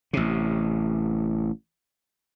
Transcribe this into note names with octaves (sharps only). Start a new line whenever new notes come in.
A1 C3